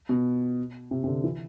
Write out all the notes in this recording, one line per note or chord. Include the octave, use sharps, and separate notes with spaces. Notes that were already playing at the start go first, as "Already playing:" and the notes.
B2
C3
C3
D3
E3